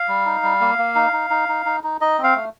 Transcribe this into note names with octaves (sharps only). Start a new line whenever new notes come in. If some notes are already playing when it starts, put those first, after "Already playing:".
Already playing: F5
G3
D#4
G3
A#3
A#3
D#4
D#4
D#4
D#4
D#4
D#4
D#4 D#5
C4
F5
A3